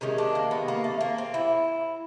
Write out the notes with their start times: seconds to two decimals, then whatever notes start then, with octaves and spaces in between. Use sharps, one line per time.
0.01 C3 D#3 G#3 C#4
0.18 D4
0.35 A#3
0.51 B3
0.68 A#3
0.84 A3
1.01 A#3
1.18 C4
1.34 E4